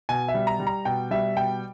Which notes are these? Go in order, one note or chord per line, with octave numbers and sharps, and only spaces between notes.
B2 G#5
E5
G3
A#5
G3
A#5
B2 G5
G3 E5
B2 G5